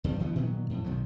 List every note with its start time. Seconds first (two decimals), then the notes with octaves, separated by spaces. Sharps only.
0.04 E2 G2 D#3 G3
0.19 G1 E3 F3 B3
0.35 A#2 D#3 F#3 B3
0.70 F2 A2
0.84 B1 D#3 F3 F#3